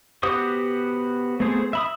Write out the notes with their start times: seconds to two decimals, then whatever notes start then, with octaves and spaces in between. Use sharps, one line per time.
0.23 B3 F#4 G4 C5 D#6
1.40 A3 B3 C4 G#4 C5
1.73 E5 B5 D#6